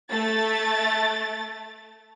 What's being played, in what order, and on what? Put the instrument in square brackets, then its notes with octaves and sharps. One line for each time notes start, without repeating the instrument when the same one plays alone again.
[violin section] A3 A6